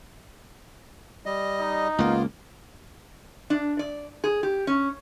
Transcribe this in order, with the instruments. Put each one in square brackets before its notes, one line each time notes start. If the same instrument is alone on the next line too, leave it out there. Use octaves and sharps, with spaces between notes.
[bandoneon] G3 D#5
[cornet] D#4
[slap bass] C#2 A#3 [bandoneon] B3 F4
[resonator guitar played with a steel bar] D4
D5
G#4
G4
C#4